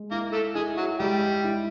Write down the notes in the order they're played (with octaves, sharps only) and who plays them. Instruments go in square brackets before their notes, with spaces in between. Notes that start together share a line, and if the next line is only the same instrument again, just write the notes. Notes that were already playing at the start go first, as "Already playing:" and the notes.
Already playing: [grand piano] G#3
[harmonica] A#3 A#4 [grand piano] E4
[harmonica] A3 A4
[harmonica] G#3 G#4 [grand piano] E4
[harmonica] F#3 F#4
[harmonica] G3 G4 [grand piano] G#3
[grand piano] E4